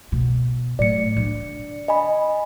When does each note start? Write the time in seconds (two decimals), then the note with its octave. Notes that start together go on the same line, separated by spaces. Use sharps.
0.12 B2
0.79 A2 F#3 D5 C#7
1.16 D3
1.88 D#5 G#5 B5